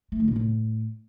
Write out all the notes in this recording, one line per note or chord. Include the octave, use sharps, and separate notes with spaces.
A3
D3
A#2
A2